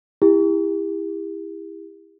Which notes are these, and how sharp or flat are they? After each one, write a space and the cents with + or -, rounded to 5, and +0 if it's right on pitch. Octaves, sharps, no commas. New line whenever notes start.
E4 +0 G4 +40